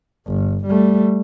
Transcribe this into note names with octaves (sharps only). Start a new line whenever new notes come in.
G1
G3 A3